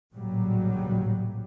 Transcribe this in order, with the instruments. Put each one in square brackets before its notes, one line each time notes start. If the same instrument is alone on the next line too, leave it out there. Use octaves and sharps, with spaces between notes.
[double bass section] A1 D2 A#2 C#3 F#3 G3